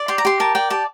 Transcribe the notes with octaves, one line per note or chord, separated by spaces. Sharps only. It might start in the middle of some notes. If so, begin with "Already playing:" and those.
Already playing: D5
G4 C6
A#5
G4 C6
A#4 A5
D5 G5
G4 A5